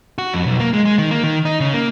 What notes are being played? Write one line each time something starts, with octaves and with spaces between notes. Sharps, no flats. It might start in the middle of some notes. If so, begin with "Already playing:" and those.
F#4
F2
B1
A#3
G#3
G#3
D#3
A#3
D#3
D#4
C#3
A#3